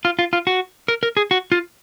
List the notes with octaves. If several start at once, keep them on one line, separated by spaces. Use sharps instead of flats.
F4
F4
F4
F#4
A#4
A#4
G#4
F#4
F4